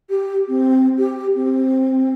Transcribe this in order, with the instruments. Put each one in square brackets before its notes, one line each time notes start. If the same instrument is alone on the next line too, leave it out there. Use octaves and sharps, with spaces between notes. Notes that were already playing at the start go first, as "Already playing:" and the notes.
[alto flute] G4
C4
G4
C4